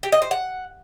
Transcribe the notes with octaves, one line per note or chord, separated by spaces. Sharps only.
G4
D#5
C5
F#5